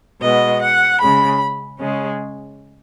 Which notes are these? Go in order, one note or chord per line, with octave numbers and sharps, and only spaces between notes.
B2 G#3 B3 D#5
F#5
C#3 G#3 C#4 B5
C#3 G#3 C#4